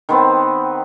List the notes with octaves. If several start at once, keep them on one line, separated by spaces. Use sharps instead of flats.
D#3 B3 C4